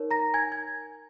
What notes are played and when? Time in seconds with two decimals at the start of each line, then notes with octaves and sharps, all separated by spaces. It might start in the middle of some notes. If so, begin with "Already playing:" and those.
Already playing: D#4 A#4 C#5
0.11 A#5 A#6
0.34 G#5 G#6
0.52 G#6